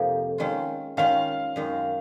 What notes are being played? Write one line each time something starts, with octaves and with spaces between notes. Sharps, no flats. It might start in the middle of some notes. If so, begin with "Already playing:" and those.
Already playing: F2 C3 F3 A#3 D#4
D#3 G#3 C#4 F4
D#3 G#3 C#4 F4 F5
F#2 D#3 G#3 D#4